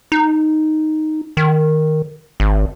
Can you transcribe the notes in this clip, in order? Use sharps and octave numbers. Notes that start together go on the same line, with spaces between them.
D#4
D#3
G#1